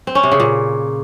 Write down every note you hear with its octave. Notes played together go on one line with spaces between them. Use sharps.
C4
C#4
C3
C#3
A#2